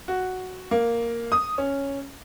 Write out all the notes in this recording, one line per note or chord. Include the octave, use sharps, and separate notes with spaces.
F#4
A#3
D#6
C#4